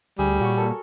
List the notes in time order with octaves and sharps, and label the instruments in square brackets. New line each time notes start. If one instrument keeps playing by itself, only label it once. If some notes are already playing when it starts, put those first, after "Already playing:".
[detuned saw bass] D2 [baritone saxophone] G3 [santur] G#4
[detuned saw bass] A#2 [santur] F#4 C#5
[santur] A4 A#4